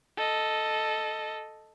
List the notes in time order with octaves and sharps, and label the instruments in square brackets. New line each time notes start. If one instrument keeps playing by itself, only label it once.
[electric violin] A4 D#5